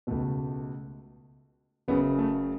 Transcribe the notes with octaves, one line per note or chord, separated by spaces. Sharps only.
C#2 B2 A3
F#1 F#2 C#3 B3
A3